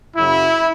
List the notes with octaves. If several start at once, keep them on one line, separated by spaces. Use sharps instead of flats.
F#2 C#3 F#3 E4